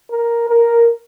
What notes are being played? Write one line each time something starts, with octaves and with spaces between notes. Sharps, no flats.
A#4
A#4